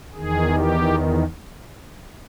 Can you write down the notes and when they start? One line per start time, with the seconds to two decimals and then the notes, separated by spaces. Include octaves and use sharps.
0.14 E2 D#3 G#4
0.54 G4